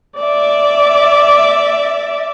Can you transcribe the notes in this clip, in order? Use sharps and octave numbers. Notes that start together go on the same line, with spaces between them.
D5 E5 D6